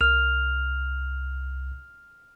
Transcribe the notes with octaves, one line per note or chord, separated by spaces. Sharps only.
C2 F6 F7